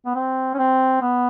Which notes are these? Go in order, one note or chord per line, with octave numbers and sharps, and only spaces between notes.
B3
C4
C#4
C4
B3